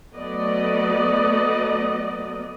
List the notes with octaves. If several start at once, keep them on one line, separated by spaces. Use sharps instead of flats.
F#3 A3 B3 D5 D#5